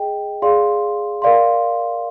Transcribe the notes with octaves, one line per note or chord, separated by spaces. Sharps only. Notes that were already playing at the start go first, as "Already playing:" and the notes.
Already playing: G#4 D#5 G5
G#4 D5 F5 C6
A#4 D5 F5 C6